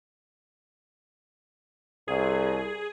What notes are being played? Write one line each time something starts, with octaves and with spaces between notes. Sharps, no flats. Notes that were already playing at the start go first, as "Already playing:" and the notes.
C2 G#4